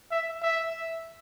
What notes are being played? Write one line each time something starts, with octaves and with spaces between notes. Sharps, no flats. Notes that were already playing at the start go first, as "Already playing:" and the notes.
E5
E5